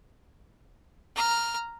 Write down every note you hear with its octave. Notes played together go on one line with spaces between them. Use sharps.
A#5 F6